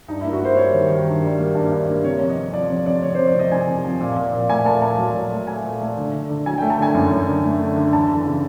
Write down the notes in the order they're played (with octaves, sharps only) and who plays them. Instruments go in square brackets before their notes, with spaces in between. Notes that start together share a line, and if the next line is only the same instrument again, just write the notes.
[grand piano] G2 D#4
E4
A#3
F#4
A#3 C5
G3 C#5
D#3
D#3
G2
G3
A#3
G2
G2
A#3
C3 C#5
F2
D#5
F2
F3 D5
F2 C#5
F2 D5
C3 C#5
C5
F2
D5
C3 D#5
C3 G#5
C3
F3
A#2
A#2
A#2
A3 G#5
A#2 A5
A#2 A5
F#3
F#3
A3
A3 G#5
A#2
A3
D3
D3
D3
F#3 G#5
G5
A3
A5
D3 G#5
F#2
F#2
D3
A3
D3
D3
E2 A5
E3
C#3